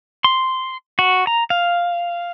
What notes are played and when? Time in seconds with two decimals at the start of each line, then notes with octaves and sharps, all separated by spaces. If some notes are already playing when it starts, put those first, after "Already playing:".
0.24 C6
0.99 F#4
1.27 A#5
1.50 F5